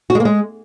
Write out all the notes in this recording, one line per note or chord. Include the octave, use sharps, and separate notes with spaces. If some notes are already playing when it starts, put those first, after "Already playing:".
F#4
G#3
A#3
G#3